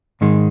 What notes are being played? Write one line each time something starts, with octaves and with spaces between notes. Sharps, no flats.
G#2 D#3 G#3